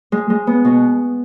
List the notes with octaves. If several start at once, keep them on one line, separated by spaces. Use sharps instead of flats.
G#3
G#3
B3
B2